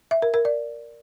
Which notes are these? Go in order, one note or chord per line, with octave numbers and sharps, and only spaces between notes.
E5
A#4
A#4
D5